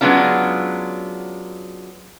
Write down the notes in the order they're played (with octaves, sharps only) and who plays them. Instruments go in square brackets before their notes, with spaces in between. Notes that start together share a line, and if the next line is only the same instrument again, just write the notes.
[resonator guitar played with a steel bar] F#3 G#3 B3 C#4 D4 F4